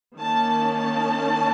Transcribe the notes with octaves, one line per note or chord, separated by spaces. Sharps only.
D#3 A#3 C#4 A5
A5